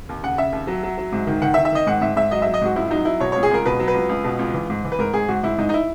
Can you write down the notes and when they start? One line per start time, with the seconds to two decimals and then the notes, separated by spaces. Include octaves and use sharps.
0.09 D#2
0.23 C#3 F#5
0.38 C#3 E5
0.52 D#2
0.67 F#3
0.83 F#3
0.98 F#3
1.12 G#2
1.27 D#3
1.42 D#3 F#5
1.54 E5
1.57 D#3
1.65 E5
1.72 D#3 D#5
1.87 G#2 F#5
2.01 G#2 E5
2.16 G#2 E5
2.31 F#3 D#5
2.42 F#3 E5
2.54 D#5
2.61 G#2 F#4
2.76 C#2 E4
2.91 F#3 D#4
3.05 F#3 E4
3.20 B2 C#5
3.32 C#2 C#5
3.43 G#4
3.51 C#2 A#4
3.65 B2 B4
3.79 F#3
3.88 B4
3.94 C#2
4.09 C#2
4.24 B2
4.39 C#2
4.54 E3
4.69 G#2
4.85 E3
4.92 B4
4.98 G#2 A#4
5.13 G#2 G#4
5.28 G#2 F#4
5.43 G#2 E4
5.58 G#2 D#4
5.69 D#4
5.74 E4